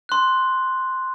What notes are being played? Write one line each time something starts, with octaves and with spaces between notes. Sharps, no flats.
C6 F#6